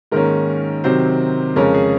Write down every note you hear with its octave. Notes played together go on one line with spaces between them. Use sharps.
G#2 D#3 A#3 C#4 A#4
C3 D#3 F#3 C4 C5
F2 C#3 G#3 C#4 A#4
G#4